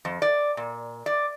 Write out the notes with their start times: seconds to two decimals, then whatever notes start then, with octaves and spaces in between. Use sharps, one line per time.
0.05 F2
0.22 D5
0.57 A#2
1.06 D5